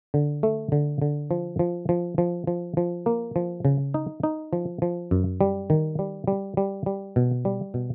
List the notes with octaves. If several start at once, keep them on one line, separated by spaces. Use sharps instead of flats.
D3
A3
D3
D3
F3
F3
F3
F3
F3
F3
A#3
F3
C#3
D#4
D#4
F3
F3
F#2
G3
D#3
G3
G3
G3
G3
B2
G3
B2